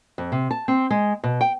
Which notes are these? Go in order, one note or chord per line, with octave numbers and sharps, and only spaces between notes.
F2
C3
A5
C4
G#3
B2
G5